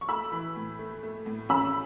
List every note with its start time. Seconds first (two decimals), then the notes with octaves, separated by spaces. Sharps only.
0.01 C#6
0.08 A3 B5 E6
0.32 E3
0.55 A2
0.79 A3
1.03 A3
1.26 A2
1.49 C#4 B5 E6